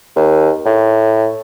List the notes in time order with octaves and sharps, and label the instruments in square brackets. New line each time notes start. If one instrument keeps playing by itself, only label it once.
[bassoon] D#2
A2